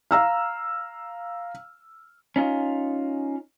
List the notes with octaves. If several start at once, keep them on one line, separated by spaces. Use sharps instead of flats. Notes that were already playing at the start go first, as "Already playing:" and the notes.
F5 A#5 E6 F6
C#4 D#4 F4